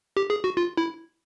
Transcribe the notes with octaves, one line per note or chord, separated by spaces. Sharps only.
G4
G#4
F#4
F4
E4